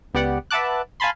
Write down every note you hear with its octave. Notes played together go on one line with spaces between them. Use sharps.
C#2 B3 G4 D5 F#5
B4 E5 F#5 A5 D6 F#6
F5 G#5 A5 B5 C6